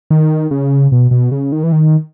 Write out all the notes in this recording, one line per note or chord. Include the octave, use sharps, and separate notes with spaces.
D#3
C#3
B2
B2
C#3
D#3
E3
D#3